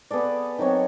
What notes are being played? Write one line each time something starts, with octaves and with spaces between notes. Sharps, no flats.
B3 G#4 A4 D5
D#3 F#3 C4 C#5